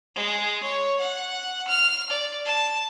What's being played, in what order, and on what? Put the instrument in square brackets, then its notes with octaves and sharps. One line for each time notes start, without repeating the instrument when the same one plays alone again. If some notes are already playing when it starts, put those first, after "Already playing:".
[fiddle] G#3
C#5
F#5
F6
D5
A5